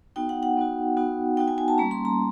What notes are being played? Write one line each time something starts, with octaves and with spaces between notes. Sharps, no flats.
B3 D#4 F#4 G5
F#5
F#5
B3 D#4 F#4
B3 D#4 F#4
B3 D#4 F#4 G5
G#5
G#5
A5
G3 A#3 C#4 A#5
C6
A#5